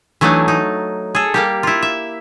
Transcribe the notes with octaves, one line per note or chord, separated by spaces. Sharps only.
E3 F#3 A3 D4 D#4
D#4
G#4 A4
G3 A#3 G4
E4 F4
E5